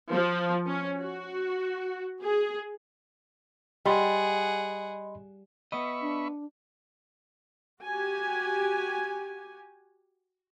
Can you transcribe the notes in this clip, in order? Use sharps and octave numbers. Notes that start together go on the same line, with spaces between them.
F3
C#4
F#4
G#4
G3 G#4 D#5 F#5 B5 C6
B3 D#5 E5 B5 C#6
D4
F#4 G4 G#5